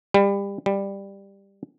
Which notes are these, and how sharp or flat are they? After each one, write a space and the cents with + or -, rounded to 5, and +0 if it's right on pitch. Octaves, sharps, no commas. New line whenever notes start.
G3 +25
G3 +10